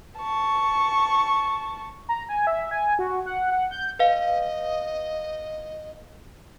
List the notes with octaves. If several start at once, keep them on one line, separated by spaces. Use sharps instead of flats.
A5 C#6
A#5
G#5
E5
G#5
F#4
F#5
F#5
G6
B4 D#5 F5